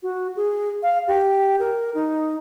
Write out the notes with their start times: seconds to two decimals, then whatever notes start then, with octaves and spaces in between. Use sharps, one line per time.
0.03 F#4
0.36 G#4
0.83 F5
1.08 G4
1.59 A#4
1.94 D#4